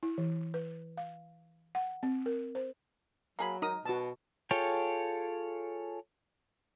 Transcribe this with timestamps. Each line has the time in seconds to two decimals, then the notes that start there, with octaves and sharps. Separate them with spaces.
0.03 E4
0.18 E3
0.54 B4
0.97 F5
1.75 F#5
2.03 C4
2.26 A#4
2.55 C5
3.39 F#3 A#3 G#4 B5
3.62 D#4 A#4 D#6
3.85 B2 F#4 A5
4.51 F4 G#4 A4 C#5 G5